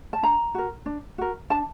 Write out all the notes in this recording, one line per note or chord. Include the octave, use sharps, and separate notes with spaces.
A5
D4 A#5
F#4 A#4
D4
F#4 A#4
D4 A5